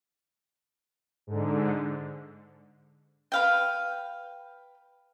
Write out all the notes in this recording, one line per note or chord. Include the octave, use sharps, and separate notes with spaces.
G#2 D3
B4 F5 G5